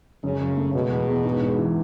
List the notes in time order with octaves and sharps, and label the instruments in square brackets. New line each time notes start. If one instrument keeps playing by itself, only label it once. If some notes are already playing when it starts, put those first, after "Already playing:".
[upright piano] F#2 [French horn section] C#3
[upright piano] F#2
A3
[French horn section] B2 [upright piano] G#3
[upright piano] E2
E2
G#2
G#2
E3